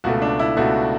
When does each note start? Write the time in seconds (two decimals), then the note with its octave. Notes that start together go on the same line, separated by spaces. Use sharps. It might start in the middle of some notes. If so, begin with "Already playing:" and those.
0.04 C#2 B2 A3 F#4
0.22 D4
0.39 E4
0.57 C#2 B2 A3 F#4